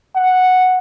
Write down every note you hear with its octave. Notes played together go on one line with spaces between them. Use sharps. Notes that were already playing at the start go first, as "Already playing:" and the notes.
F#5